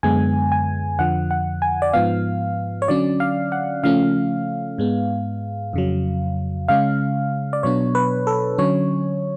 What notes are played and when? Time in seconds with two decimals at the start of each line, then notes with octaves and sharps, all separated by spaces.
0.03 F#2 D3 G#3 B3 G#5
0.52 G#5
0.99 F2 D3 F3 F#5
1.31 F#5
1.62 G#5
1.82 D5
1.93 G#2 F3 B3 F5
2.82 C#5
2.88 D3 F#3 C#4 D5
3.20 F5
3.52 F#5
3.83 C#3 F3 A3 C#4 F5
4.78 G#2 G#3 B3
5.73 F2 C#3 F#3
6.68 C#3 G#3 C#4 F5
7.53 D5
7.63 B2 F#3 B3 D4 C#5
7.95 B4
8.27 A4
8.58 D3 F#3 C#4 C#5